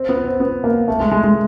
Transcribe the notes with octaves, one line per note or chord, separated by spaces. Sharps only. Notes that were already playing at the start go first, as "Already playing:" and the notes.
Already playing: C4
B3
C4
B3
A#3
A3
G#3
G#3
G#3